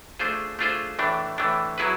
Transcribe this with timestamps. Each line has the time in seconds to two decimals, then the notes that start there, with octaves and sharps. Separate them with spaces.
0.19 A3 D4 F4 G#4 C5
0.59 A3 D4 F4 G#4 C5
0.99 A2 E3 A3 D4
1.38 A2 E3 A3 D4
1.78 F#3 B3 E4 G#4 B4